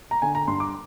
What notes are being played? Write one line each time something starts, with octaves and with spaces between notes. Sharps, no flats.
A#5
D3 G#5
A#5
G2 C6
D6